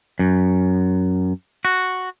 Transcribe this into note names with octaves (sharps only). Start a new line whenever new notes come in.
F#2
F#4